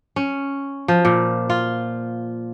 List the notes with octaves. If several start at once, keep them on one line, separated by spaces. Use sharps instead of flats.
C#4
F3
A#2
F4